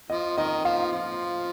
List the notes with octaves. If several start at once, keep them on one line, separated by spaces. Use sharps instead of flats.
F3 D#5
D#3 D#5
F3 F5
F3